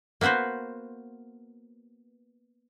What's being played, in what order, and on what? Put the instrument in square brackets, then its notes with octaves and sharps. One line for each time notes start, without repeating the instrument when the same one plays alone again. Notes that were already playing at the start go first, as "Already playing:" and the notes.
[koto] A#3 B3 F#4 B4 C5